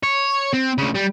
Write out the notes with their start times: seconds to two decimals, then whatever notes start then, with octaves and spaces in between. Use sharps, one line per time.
0.03 C#5
0.53 C4
0.78 D2 C#3
0.95 G3